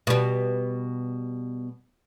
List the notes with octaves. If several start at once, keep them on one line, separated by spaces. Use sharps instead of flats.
B2 G3